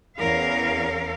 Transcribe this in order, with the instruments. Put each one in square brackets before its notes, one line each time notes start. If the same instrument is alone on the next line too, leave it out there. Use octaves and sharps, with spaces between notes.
[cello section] E2 C#4 A#4 F5